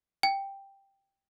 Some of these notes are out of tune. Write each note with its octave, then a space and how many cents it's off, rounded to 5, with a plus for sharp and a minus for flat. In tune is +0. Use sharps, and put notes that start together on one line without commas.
G5 +5